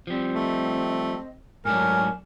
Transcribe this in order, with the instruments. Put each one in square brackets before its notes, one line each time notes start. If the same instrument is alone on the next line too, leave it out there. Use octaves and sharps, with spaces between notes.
[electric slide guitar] F3 G3 [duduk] C4
[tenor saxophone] A3 [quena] D#5
[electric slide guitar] G#2 A3 D4 [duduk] F#3 [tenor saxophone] A#4 [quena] G#5